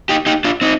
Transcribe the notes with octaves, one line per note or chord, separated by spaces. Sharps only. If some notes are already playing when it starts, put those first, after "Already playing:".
D#4 G4
D#4 G4
D4 F4
C4 D#4